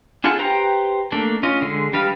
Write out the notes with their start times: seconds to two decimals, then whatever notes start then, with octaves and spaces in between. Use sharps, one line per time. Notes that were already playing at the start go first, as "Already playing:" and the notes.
0.24 D4 F4 G#4 A4 F#5
0.39 G4 B4 C5 G5 A#5
1.12 A3 A#3 D4 A4
1.43 C#4 F4 D#5
1.62 D3 G#3
1.93 G3 D4 B4 D#5 F5